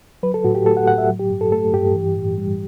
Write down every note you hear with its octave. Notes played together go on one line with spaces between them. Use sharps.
F#3 B4
A4
A2 F#4
G4
A3 A4
F#5
A2 F#5
E5
F#3
G4
G2
A4
A3 A4
G2 G4
E3
A2
G3